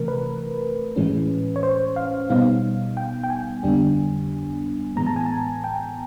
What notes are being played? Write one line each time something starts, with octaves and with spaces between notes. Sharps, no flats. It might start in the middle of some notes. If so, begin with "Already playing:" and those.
Already playing: C3 E3 A3 A#4
B4
A2 E3 G#3 C#4
C#5
C5
F5
B2 G3 B3 D#4 F5
G5
G5
G#5
F2 D3 G3 B3 D4
A2 E3 G#3 B3 A#5
A5
G#5
A5
G5